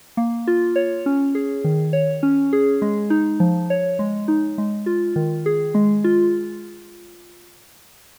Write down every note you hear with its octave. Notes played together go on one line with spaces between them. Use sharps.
A#3
F4
C#5
C#4
G#4
D#3
C#5
C#4
G#4
G#3
D#4
F3
C#5
G#3
D#4
G#3
F4
D#3
G#4
G#3
F4